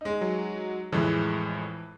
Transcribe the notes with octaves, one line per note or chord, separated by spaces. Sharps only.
G#3 D#4
F#3
F2 A2 E3 G#3